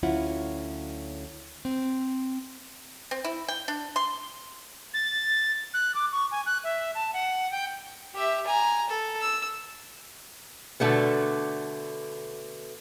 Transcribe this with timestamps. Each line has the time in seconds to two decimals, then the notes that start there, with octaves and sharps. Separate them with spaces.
0.03 D2 F#3 C#4 E4 F4 F#5
1.65 C4
3.11 C4
3.24 E4
3.48 G5
3.68 D4
3.96 C6
4.94 A6
5.74 F#6
5.95 D6
6.12 C#6
6.31 G#5
6.46 F#6
6.64 E5
6.95 A5
7.13 F#5
7.51 G5
8.14 G4 E5
8.46 G#5 A#5
8.89 A4
9.20 E6
10.80 B2 D3 A3 B3